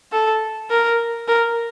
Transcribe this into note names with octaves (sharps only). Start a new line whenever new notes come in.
A4
A#4
A#4